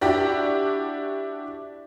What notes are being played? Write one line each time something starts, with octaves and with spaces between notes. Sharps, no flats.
D4 E4 F#4 G4 D5